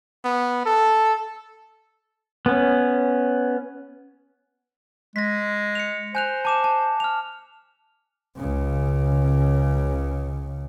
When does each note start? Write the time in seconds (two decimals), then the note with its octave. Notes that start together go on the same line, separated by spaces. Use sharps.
0.25 B3
0.66 A4
2.46 B3 C#4
5.16 G#3 A#6 B6
5.75 C#7 F7
6.15 C5 G#5 F#6 F7
6.45 A5 D6 E7
6.64 A5
7.00 F6 F7
8.37 C#2 C#3